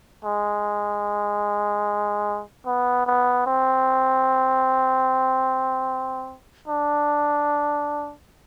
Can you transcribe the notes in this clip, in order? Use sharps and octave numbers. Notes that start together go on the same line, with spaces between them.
G#3
B3
B3
C4
D4